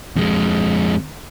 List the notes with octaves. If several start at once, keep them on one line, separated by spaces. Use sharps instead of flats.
F2 G#3